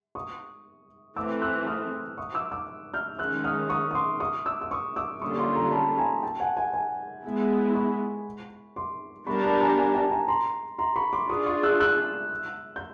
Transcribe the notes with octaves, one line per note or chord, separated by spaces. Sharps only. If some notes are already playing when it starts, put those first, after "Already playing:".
C#6 D#6
E3 A3 C4 D6 E6
E6 F#6
D#6 F6
C#6 D#6
D6 E6
D6 E6
F6 G6
D#3 G#3 C#4 E6 F#6
D#6 F6
C#6 D#6
D#6
C6 D6
C#6 D#6
D6 E6
E6
C#6 D#6
D6 E6
D3 G3 A#3 C#4 F4 C#6 D#6
C6 D6
A#5 C6
A5 B5
G#5 A#5
G5 A5
F#5 G#5
F#5 G#5
F#5 G#5
G#3 B3 E4
B5 C#6
C6 D6
G3 B3 D4 G4 A#4 B5 C#6
A5 B5
G#5 A#5
G#5 A#5
G5 A5
G#5 A#5
A#5 C6
A#5 C6
B5 C#6
C6 D6
D4 F4 G#4 C#6 D#6
C#6 D#6
E6 F#6
E6 F#6
G6